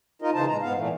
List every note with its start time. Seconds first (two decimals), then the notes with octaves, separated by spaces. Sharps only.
0.22 D#4 F4 A#4 D#5
0.34 C#3 E3 D#4 C5 A5
0.48 A#2 G#3 A#5
0.62 G#2 B3 F5
0.76 A#2 E3 A3